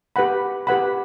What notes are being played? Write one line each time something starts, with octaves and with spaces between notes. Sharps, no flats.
G4 B4 F#5 B5
G4 B4 F#5 B5